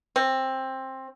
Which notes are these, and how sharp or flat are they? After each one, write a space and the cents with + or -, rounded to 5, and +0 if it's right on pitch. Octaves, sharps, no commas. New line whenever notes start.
C4 +15